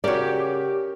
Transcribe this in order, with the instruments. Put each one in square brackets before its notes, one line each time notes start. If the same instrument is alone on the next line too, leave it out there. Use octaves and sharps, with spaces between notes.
[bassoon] C#3 [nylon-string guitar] F#4 D5 [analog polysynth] G4 [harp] A#4 C#5